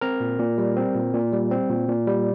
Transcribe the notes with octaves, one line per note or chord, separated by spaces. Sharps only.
C4 A#4 A#5
A#2
A#2
G3
C4
A#2
A#2
G3
C4
A#2
A#2
G3